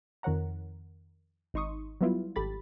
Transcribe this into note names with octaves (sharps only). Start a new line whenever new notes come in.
F2 D#3 A#4 C#5 F#5 A#5
G#1 D#4 C6 C#6 D#6
F#3 G3 B3 E4 F4
G#1 G4 A4 B5 A6